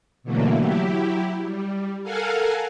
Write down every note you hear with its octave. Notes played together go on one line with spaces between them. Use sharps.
B2 D3 E3 F#3 A3 A#3
F#3 E4 G4
G3
A4 A#4 F5 F#5 G#5